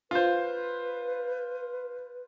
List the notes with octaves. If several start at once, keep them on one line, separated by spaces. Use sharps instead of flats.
F4 B4 C5